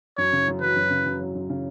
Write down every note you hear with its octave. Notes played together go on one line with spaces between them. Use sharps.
F#2 C#5
C#3
F#2
F#3 B4
F#2
C#3
F#2
F#3
F#2
C#3